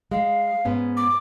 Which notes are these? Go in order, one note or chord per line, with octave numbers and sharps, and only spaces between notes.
G#3 F5
G#2 B3 C#4
D6